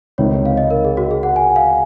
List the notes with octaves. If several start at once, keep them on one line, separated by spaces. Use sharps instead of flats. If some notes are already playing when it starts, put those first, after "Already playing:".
C#2 C3 D#3 C#5
F5
D#5
A#4
G#4
F#4
G#4
F#5
G#5
F5